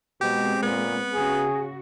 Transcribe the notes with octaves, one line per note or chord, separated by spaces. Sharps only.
B2 G#3 C4 G4 G#4
A#2 B3
C#3 F#4 G#4